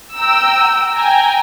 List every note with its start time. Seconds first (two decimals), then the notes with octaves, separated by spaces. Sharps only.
0.15 G5 A#5 E6
0.97 G5 G#5 A#5